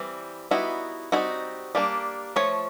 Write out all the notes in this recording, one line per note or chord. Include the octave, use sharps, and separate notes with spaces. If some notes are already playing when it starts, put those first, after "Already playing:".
Already playing: E3 G3 C4
G3 B3 D#4 E4 F#4
G3 C4 D#4 E4 F#4
G3 A#3 D4
F3 A3 C#5